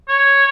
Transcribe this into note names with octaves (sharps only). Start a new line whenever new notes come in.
C#5